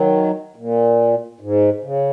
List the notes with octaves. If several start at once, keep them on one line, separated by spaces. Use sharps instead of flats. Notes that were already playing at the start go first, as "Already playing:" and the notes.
Already playing: D#3 F#3
A#2
G#2
C#3